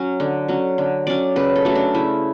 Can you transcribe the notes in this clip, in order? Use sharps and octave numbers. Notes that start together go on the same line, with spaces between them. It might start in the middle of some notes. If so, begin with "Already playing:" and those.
Already playing: F#3 C#4
D3
F#3 C#4
D3
F#3 C#4 D5
C#3 B4
A4
F#3 A3 C#4
D4
C#3 E4